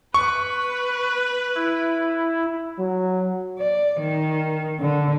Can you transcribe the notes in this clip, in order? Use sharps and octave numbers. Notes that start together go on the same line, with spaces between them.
B4 C#6
E4
F#3
D5
D#3
D3